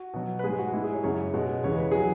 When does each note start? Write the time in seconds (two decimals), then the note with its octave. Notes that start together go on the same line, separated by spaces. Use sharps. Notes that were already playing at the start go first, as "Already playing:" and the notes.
Already playing: F#4
0.14 B2 F#3
0.39 B4
0.43 G#2 G#3 G#4
0.59 F#4
0.73 G#2 G#3 E4
0.84 G#4
0.93 C#5
1.04 F#2 C#3 F#3 C#5
1.34 B2 G#3
1.64 E2 C#3 E3 G#3 C#5
1.78 B4
1.91 F#3 G#4